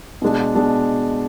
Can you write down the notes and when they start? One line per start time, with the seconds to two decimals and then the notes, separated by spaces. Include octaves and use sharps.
0.22 B2 G#3 D4
0.55 B2 G#3 D4